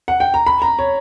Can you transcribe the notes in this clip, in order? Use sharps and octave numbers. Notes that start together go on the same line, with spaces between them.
F#5
G5
A#5
B5
A#5
C#5